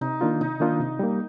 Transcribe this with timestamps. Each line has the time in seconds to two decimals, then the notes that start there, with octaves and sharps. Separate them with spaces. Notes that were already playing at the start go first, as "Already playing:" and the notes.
0.01 C3 D#4
0.21 D#3 A#3 D4 F4
0.41 C3 D#4
0.60 D#3 A#3 D4 F4
0.80 C3
0.99 G3 A#3